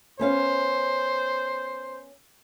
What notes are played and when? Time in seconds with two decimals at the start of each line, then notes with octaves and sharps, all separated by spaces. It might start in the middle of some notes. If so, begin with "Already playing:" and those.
0.19 B3 C#4 C5 F5